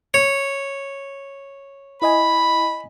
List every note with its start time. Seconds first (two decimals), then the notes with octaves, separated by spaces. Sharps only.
0.14 C#5
2.02 E4 D#5 G#5 B5